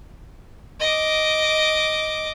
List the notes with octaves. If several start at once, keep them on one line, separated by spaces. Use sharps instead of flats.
D#5 D6